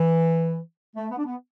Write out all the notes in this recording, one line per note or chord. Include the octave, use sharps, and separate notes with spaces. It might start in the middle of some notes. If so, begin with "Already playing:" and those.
Already playing: E3
A3
B3
D4
B3